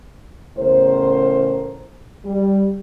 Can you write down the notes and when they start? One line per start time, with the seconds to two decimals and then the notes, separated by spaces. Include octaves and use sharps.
0.57 E2 A2 C#3 A#4 C5
2.25 G3